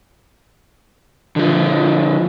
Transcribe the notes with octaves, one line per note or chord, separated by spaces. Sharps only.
D3 F3